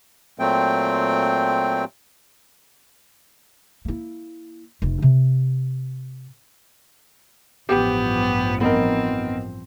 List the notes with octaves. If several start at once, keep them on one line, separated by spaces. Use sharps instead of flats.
A#2 F#3 A3 C4 G5
A#3 E4
F1 F4
C3
A1 G2 F3 B3 G4
B3 C4 D#4 A#4